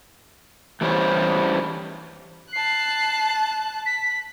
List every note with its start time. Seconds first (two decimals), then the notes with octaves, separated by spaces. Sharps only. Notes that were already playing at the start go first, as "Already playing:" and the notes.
0.81 E3 G3 C#4 C5
2.53 A5 F#6 C7
3.86 B6